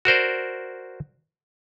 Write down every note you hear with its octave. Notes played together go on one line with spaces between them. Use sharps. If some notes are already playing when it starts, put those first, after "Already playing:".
F#4 A#4 C5 D5